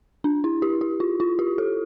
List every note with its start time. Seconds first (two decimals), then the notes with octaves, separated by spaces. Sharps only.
0.24 D4
0.44 E4
0.62 G4
0.81 G4
1.00 F4
1.20 F4
1.39 G4
1.58 A4